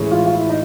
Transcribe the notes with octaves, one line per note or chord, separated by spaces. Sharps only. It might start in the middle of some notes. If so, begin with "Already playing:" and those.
Already playing: A2 E3 G#3 C#4
F4
F4
E4
D#4